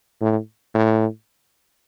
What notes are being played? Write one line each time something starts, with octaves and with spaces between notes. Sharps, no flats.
A2
A2